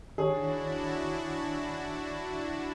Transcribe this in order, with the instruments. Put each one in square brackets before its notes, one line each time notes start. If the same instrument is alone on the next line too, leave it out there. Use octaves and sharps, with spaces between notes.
[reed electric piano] D#3 C#5 [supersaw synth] D4 E4 F#4 [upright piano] G#4